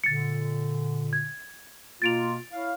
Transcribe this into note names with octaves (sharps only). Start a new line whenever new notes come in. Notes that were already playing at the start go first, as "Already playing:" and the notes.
A#2 D3 A6 C#7
G#6
B2 A#3 F4 A6 D7 F7
E4 C#5 F5